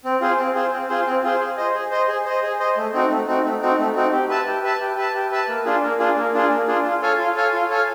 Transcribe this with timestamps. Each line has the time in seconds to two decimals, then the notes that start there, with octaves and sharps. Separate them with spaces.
0.04 C4
0.21 F4 G#4 C5
0.38 C4
0.55 F4 G#4 C5
0.72 C4
0.89 F4 G#4 C5
1.06 C4
1.23 F4 G#4 C5
1.40 G#4
1.57 C5 D#5
1.74 G#4
1.91 C5 D#5
2.08 G#4
2.25 C5 D#5
2.43 G#4
2.60 C5 D#5
2.77 A3
2.93 C4 D#4 F#4
3.10 A3
3.28 C4 D#4 F#4
3.44 A3
3.61 C4 D#4 F#4
3.79 A3
3.96 C4 D#4 F#4
4.12 G4
4.29 B4 E5 A5
4.47 G4
4.63 B4 E5 A5
4.80 G4
4.97 B4 E5 A5
5.14 G4
5.32 B4 E5 A5
5.49 A#3
5.65 D4 F4 G#4
5.83 A#3
5.99 D4 F4 G#4
6.17 A#3
6.34 D4 F4 G#4
6.50 A#3
6.67 D4 F4 G#4
6.85 F4
7.02 A4 C#5 F5 G#5
7.19 F4
7.35 A4 C#5 F5 G#5
7.53 F4
7.69 A4 C#5 F5 G#5